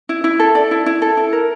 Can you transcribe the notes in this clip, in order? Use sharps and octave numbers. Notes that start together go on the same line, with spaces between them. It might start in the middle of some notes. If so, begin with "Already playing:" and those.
E4
E4
A4
D5
E4
E4
A4
E4
A#4